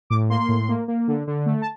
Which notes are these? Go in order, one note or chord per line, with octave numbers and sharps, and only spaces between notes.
A2 D6
A#3 C6
A2
A#3
A#3
D3
D3
A3
A5